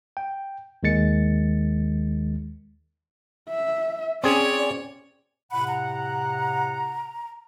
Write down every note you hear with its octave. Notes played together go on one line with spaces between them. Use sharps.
G5
D#2 D#3 G#3 A6 C#7
E5
C4 C#4 G#4 C#5 D5
A2 C3 F#5 B5
A#5